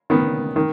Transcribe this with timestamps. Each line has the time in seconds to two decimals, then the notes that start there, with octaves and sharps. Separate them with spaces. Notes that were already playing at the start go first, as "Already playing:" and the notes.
0.10 D#3 B3
0.56 D#3